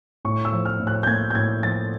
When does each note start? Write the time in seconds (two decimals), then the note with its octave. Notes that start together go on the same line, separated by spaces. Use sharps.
0.25 A2 C#6
0.45 E6
0.52 F3
0.65 F6
0.80 A2
0.87 F#6
1.03 G6
1.07 A#3 G#6
1.30 G6
1.35 A2 G#6
1.62 F3 A6